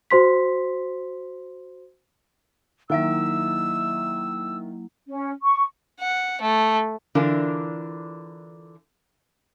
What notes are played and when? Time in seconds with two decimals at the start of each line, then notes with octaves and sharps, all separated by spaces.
0.10 F#4 C5 C6 B6
2.90 D#3 F#3 A#3 E4 E5 E6
5.07 C#4
5.42 C#6
6.00 F#5
6.41 A3
7.15 D3 E3 D4 F4 A#4